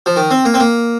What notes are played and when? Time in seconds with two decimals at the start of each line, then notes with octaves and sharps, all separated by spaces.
0.06 F3
0.16 D#3
0.31 C4
0.45 A#3
0.54 C4
0.60 A#3